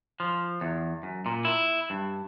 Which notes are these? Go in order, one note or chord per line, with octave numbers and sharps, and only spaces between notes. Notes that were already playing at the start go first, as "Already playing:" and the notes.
F3
E2
F#2
A#2
E4
G2